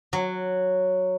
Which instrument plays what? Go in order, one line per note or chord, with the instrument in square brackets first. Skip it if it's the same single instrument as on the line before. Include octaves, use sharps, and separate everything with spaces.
[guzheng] F#3